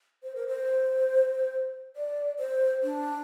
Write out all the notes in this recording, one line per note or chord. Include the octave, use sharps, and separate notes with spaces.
C5
A#4
C5
D5
C5
D4